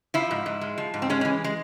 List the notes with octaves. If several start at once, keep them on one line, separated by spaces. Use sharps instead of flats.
F3 E4
G#2
G#2
G#3
F3
G#2
C4
G#3 C#4
C#4
E3
G#3